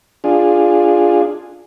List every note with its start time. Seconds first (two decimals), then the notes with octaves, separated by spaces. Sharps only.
0.24 D4 F4 G#4